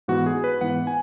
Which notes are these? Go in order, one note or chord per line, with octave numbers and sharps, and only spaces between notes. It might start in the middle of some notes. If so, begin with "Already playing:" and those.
G#2 E3 B3 F#4
G#4
B4
G#2 E3 B3 F#5
G#5